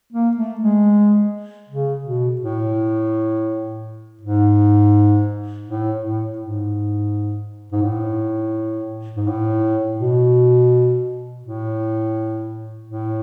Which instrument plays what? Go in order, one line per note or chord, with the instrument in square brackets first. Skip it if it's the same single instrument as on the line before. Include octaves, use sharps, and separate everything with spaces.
[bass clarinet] A#3
A3
G#3
C#3
B2
A2
G#2
A2
A2
G#2
G#2
A2
G#2
A2
B2
A2
A2